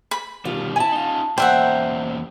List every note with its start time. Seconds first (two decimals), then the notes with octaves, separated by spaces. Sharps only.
0.11 B5
0.45 B2 D#3 G3 F4
0.76 E4 G#5 A5
0.92 D#4 F4
1.38 E2 A#3 C5 D5 E5 F#5 G5